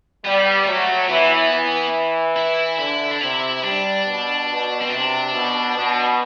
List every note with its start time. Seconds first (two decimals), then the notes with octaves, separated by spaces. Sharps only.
0.25 G3 B3
0.67 F#3 A3
1.09 E3 B3
1.51 E3
2.36 E4
2.79 D3 E4
3.11 D4
3.21 C3 E4
3.63 G3 D4
4.06 B2
4.48 B2
4.82 C4
4.90 C3 D4
5.33 B2
5.75 B2